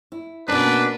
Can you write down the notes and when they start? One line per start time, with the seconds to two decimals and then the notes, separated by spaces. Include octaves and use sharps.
0.12 E4
0.48 B2 A#3 C#4 D4 A#4 B4